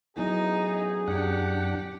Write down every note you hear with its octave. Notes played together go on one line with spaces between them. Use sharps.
A1 F#3 B3 D#4 E4 G#4
F#2 D4 G4 F#5